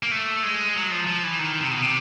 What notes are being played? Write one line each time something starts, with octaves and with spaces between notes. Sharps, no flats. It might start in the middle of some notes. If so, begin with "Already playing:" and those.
A#3
A3
G#3
F#3
F3
F3
E3
D#3
C3
B2
C3